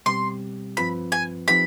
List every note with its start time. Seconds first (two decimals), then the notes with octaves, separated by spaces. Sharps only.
0.06 B2 G3 C4 G4 C6
0.77 G2 F3 C4 F4 B4 B5
1.12 G#5
1.48 F3 C4 D#4 G4 B4 B5